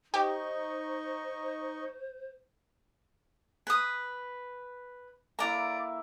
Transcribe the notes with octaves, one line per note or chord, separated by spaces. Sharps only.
D#4 G4 C5 D#5 C#6
B4 D#6
A#3 E4 D5 A#5